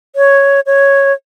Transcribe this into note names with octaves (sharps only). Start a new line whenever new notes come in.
C#5
C#5